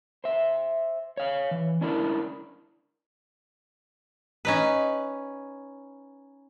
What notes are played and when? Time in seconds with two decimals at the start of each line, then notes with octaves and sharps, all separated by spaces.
0.24 C5 E5
1.17 C#5 F5
1.51 E3
1.81 C#4 D4 E4 A#4
4.45 C#4 D#4 B4